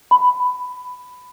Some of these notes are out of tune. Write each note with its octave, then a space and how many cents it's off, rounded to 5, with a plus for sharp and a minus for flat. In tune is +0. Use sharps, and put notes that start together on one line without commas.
B5 +15